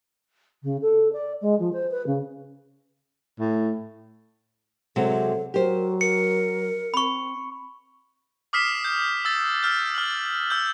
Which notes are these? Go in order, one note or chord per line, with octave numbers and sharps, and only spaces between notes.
C#3
A4
D5
G#3
F3
C5
B4
C#3
A2
C3 F#3 G#3 A4
F#3 G4 A#4 C5
A#4 C#7
C4 B5 C#6
D6 D#6 F6 B6 C7 E7
G6
E6 A6
E6 F6 G6
F6 F#7
E6 G6